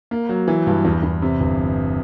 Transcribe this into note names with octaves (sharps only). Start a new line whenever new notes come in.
A#3
F#3
E3
G2
E2
E2
C3
G1